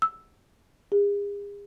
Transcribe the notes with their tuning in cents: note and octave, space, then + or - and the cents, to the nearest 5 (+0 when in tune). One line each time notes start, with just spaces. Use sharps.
E6 +0
G#4 -40